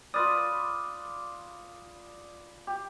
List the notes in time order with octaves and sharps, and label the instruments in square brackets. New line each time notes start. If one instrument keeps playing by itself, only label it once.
[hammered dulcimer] F4 B4 D5 [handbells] D#6 F6 A6
[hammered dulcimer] G4